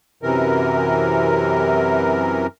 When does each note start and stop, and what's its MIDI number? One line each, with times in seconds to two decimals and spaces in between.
0.23 2.46 42
0.23 2.46 48
0.23 2.46 52
0.23 2.46 70